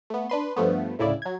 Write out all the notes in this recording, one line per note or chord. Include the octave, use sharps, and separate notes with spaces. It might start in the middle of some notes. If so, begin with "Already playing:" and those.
A3 B3
D4 B4 C6
G2 F3 A3 B3
D2 A2 C#3 E4 D5
F#3 G#6